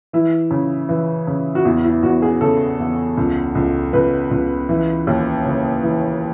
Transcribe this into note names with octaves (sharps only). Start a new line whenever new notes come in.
E3 E4
C#3
E3
C#3
F#4
E2 E4
E4
E2 F#4
G#4
C#3 A4
E2
C#2
C#2
C#2 B4
C#2
E3
D#2
C#3
E3